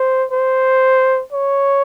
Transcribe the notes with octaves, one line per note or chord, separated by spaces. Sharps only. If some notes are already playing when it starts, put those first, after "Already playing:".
Already playing: C5
C5
C#5